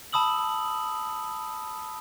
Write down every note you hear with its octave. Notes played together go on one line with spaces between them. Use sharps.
A5 B5 D#6 E6 F#7